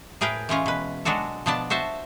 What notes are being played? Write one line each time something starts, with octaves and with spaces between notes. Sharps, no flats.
A2 G#4 A#4 B4 G5
E3 G#3 C#4 F4
B2 B4
F#3 G#3 D4 F#4 A4
B2 F3 B3 D4 D5 A5
F#4 C5 E5 A5